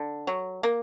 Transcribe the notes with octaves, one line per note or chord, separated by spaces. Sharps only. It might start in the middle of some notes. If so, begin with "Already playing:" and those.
Already playing: D3
F#3
A#3